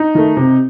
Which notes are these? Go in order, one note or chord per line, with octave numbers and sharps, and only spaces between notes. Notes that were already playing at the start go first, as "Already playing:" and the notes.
Already playing: D#4
D#3 A3
C3